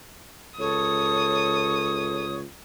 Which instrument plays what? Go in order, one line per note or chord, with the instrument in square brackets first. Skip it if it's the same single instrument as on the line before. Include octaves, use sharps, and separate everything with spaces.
[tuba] C#2 [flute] A4 [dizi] C#5 [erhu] D#6